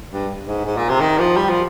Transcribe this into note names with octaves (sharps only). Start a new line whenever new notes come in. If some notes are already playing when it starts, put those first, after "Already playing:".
G2
G#2
G#2
A#2
C3
D#3
F3
G3
F3